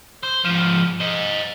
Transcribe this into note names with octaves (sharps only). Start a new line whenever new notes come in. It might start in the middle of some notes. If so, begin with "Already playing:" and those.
C5
G#2 F3
C5 D#5